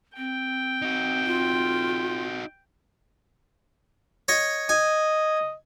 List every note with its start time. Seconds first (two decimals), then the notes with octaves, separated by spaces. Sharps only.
0.17 C4 G5
0.82 D#4 F#4
1.26 F4
4.28 C#5 D#5
4.69 D#5 G#5